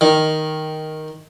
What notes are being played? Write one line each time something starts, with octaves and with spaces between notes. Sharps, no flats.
D#3